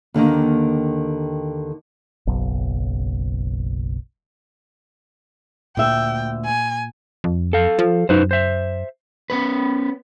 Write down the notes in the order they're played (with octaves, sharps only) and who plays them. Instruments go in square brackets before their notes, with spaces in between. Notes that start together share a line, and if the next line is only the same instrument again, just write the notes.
[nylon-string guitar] D#2 D3 D#3 A#3
[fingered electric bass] F#1 B1
[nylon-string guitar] D2 E5 [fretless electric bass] A#2 [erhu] G5
[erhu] G#5
[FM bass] F2
[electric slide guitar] A4 F5
[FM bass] F3
[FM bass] F#2 [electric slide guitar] D#4 B4 C5
[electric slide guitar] C5 E5
B3 C#4 B4